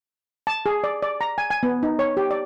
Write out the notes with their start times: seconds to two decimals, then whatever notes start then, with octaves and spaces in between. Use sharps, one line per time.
0.47 A5
0.66 G#4
0.84 D5
1.02 D5
1.21 A#5
1.38 G#5
1.50 G#5
1.63 B3
1.83 D#4
1.99 C#5
2.17 G4
2.31 D5